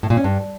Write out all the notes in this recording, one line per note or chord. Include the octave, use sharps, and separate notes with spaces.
A2
A#2
C#4
G2